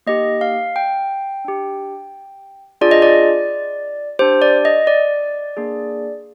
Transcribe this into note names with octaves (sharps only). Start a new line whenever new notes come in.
A#3 D#4 G4 D#5
F5
G5
D4 G4
D4 F4 G#4 D5
D#5
D5
D4 G4 C5
D5
D#5
D5
A#3 D4 G#4